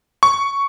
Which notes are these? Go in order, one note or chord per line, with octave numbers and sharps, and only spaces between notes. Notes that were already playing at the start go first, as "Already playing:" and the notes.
C#6